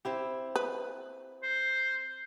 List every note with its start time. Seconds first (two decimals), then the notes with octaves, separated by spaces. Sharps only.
0.05 C4 E4 G4
0.56 B4
1.43 C5